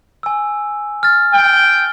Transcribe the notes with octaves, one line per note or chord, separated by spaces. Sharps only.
G#5 E6
F6 A6
G5